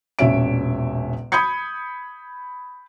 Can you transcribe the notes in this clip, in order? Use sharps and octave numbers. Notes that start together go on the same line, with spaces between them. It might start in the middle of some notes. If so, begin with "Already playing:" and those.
E1 A#1 C#4 E5 D7
B5 D#6 G6 G#6 C#7